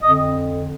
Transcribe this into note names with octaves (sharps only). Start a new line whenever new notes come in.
F2 D3 D#5